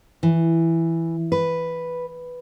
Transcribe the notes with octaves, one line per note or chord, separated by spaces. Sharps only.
E3
B4